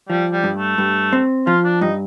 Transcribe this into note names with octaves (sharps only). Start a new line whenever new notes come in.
F3 G3
G3
G2
A3
G2
C4
F3 F4
D4
G2 D#4